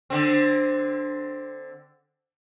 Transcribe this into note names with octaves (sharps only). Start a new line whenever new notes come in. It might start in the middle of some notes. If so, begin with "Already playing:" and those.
D3 C4